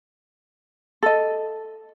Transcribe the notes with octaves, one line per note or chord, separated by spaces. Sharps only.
A4 D#5